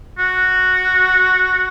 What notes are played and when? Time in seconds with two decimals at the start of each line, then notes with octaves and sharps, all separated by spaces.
0.19 F#4